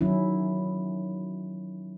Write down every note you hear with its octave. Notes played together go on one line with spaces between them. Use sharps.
D#3 F#3 C#4 E4